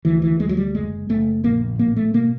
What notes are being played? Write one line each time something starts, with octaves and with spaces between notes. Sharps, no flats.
D2 E3
E3
D2 G#3
F#3
G3
F#1 G#3
F#1 A3
A#1 A#3
A2 A#3
A3
B2 A#3